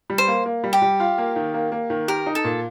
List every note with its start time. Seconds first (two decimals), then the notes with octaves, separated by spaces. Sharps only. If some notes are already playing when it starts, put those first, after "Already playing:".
0.10 G3
0.18 C5
0.28 A#3
0.46 A#3
0.64 G3
0.73 G4
0.82 G3
1.00 F4
1.18 A#3
1.36 D#3
1.54 A#3
1.72 A#3
1.90 D#3
2.08 G4 A#4
2.26 D#4
2.35 A4
2.44 A#2